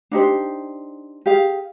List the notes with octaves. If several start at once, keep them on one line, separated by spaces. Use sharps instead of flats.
D4 D#4 G4 C5
G4 G#4 F5